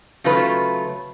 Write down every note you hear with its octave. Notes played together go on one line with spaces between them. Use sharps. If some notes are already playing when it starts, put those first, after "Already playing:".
C#3 F#3 A3 F4 B4